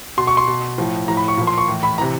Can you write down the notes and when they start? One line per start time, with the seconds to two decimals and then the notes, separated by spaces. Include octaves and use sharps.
0.17 B2 C6
0.27 C#6
0.37 C6
0.47 B2
0.78 A2 F3
1.08 A2 F3 A#5
1.17 B5
1.28 C#6
1.37 A#2 F3
1.47 C6
1.58 C#6
1.68 A2 E3
1.83 B5
1.98 C3 E3 A#5